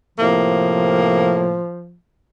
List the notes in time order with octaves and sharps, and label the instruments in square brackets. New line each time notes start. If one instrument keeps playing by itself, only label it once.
[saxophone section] A2 C3 A#3 [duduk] F3